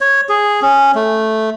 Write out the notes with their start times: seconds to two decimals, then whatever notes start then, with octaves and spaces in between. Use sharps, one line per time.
0.01 C#5
0.29 G#4
0.62 C#4
0.95 A3